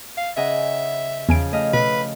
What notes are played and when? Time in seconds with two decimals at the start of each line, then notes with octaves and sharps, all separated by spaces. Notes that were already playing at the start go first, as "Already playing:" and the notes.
0.17 F5
0.37 C#3 D#5 E5 F#5
1.29 E2 C#3 F3 G#5 D7
1.52 A3 D#5 F5
1.73 B2 B4